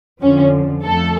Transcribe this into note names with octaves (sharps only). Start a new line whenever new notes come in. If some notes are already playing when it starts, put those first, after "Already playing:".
F2 D3 F3 C#4
F2 F3 A3 A4